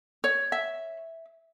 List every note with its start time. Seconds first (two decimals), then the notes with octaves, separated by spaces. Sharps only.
0.24 C#5
0.52 E5